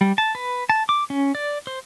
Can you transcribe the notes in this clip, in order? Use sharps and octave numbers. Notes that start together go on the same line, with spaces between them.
G3
A5
B4
A5
D6
C#4
D5
C5